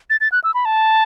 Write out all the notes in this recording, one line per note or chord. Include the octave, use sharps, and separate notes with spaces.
A6
A6
F#6
E6
B5
A5